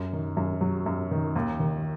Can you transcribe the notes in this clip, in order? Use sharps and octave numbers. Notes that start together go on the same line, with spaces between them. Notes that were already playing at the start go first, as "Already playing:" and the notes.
Already playing: F#2
D#3
F#2
F#3
F#2
D#3
D#2
D#3